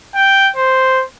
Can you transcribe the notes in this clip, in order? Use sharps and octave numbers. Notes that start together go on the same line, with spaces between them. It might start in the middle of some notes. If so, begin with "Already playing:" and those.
G5
C5